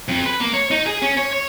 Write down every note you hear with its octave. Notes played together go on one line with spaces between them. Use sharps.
F2
B4
A#3
C#5
D#4
G#4
C#4
C#5
C#5